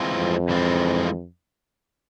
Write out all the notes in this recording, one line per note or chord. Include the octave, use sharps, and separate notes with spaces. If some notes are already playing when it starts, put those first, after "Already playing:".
Already playing: E3 G#3 C4 F4
F2
E3 G#3 C4 F4